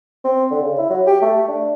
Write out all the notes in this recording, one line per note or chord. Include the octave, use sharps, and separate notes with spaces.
C4
D3
C#3
E4
F#3
G4
A3
D4